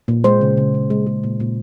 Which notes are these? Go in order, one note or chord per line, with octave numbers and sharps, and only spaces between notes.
A#2
G#3 C5
C#3
C#3
C#3
G#3
G#3
A#2
A#2